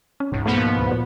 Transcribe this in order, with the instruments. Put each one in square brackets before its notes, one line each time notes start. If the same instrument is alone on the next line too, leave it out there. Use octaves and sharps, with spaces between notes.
[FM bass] C#4
[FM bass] E1 [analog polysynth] C#2 [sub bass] G#2
[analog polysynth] B2 F3 B3 [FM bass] A3
[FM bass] A#3
D2
A#2